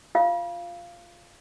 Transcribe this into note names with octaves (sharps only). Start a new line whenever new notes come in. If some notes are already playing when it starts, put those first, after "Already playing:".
F4 F5